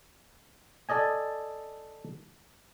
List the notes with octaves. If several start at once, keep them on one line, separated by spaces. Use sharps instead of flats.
A4 D5 D#5 G#5